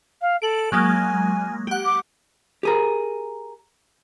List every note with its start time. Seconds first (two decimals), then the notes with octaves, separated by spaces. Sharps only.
0.21 F5
0.42 A4 D7 F#7
0.72 F#3 G#3 A#3 G#5
1.67 G4 F#5
1.85 D6
2.63 G4 G#4 A#4